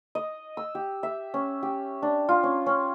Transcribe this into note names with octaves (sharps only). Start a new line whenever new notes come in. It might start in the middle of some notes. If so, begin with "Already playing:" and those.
D#5
E6
G4
E5
C#4
G4
D4
F4
C#4
C#4